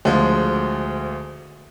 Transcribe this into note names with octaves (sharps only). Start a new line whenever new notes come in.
D2 F3 G#3